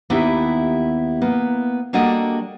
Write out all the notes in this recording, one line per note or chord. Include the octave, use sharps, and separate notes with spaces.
D#2 B3 D#4 E4 G4 E5
A#3 B3
G3 A#3 D4 F#4 A4 D#5